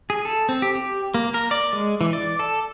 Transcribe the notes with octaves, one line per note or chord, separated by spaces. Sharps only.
G#4
A4
C4
G4
G4
A#3
A#4
D5
G#3
E3
D5
A4